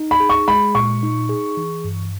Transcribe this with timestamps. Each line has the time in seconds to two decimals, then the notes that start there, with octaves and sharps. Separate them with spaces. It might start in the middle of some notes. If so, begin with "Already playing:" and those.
Already playing: D#4
0.11 B5
0.20 G#4
0.30 C#6
0.48 G#3 B5
0.75 A#2 C#6
1.03 D#4
1.29 G#4
1.57 E3
1.84 G2